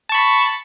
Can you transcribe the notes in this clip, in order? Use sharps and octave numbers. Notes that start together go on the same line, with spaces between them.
A5 B5 C#6